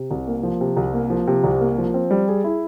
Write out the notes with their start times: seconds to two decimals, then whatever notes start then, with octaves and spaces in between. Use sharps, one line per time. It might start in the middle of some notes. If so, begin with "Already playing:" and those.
Already playing: C3
0.11 C2
0.28 A#3
0.43 F3
0.61 C3
0.77 C2
0.94 A#3
1.10 F3
1.27 C3
1.44 C2
1.61 A#3
1.78 F3
1.94 C4
2.11 G3
2.29 G#4
2.44 E4